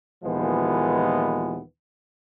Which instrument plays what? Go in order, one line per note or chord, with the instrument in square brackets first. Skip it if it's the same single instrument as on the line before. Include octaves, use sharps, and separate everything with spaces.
[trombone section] D#2 A#2 E3 F3 G#3 B3